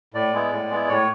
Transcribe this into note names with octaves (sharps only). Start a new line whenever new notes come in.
A2 D5
G#3 B3 E4
A2
G#3 B3 E4
A2 C#5